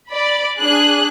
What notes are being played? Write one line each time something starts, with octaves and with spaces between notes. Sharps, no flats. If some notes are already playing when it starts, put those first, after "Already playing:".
D5 B5
D4 G#4 F#6